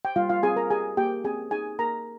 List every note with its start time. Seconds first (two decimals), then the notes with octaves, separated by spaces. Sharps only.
0.05 G5
0.16 G3 F4 F5
0.29 F4 F5
0.43 C4 G#4 G#5
0.56 A#4 A#5
0.70 G4 G#4 G#5
0.97 A#3 G4 G5
1.24 C4 G#4 G#5
1.51 D#4 G#4 G#5
1.78 A#3 A#4 A#5